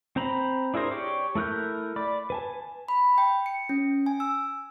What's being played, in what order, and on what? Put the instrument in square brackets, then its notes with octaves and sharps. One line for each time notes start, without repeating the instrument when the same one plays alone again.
[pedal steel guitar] C4 C5 A#5 B5
D4 E4 G#4 A#4 C5
G4 C#5 D5
A3 E4 A#4 F#6 G6
D5 B5 D6
B4 G#5 A5
[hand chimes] B5
G5
C#7
C#4
G#5
E6